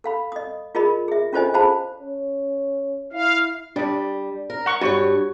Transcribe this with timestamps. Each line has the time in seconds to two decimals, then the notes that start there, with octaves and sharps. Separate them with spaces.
0.04 A4 F5 B5
0.32 D#5 D#6
0.75 F4 G#4 A#4 D#5 B5
1.08 G#4 E5
1.33 C#4 F4 A4 C5 D#5 G#5
1.54 G#4 C5 F5 A5 B5
1.99 C#4
3.13 E4 F5
3.76 G3 D4 D5
4.50 A#4
4.66 F#5 C#6
4.81 G2 F#4 C#5 C#6